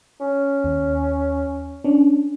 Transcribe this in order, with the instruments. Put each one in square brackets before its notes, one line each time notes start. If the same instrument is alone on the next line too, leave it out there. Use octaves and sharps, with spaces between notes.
[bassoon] C#4
[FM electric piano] D#2
C#4 D4